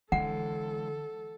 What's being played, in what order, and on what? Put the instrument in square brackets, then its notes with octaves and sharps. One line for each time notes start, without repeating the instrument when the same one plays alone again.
[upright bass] D3 [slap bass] E3 G#3 [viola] A4 [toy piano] F#5